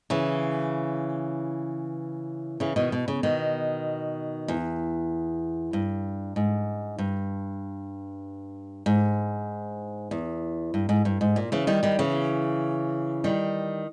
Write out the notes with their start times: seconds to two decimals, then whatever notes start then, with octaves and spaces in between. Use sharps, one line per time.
0.10 C#3 E3
2.60 C#3 E3
2.76 B2 D#3
2.92 B2
3.08 C#3
3.23 B2 D#3
4.48 E2
5.73 G2
6.36 G#2
6.98 G2
8.86 G#2
10.11 E2
10.74 G2
10.89 G#2
11.05 G2
11.21 G#2
11.36 A#2
11.52 C#3 E3
11.67 D#3 G3
11.83 D#3 G3
11.99 C#3 E3
13.24 D#3 G3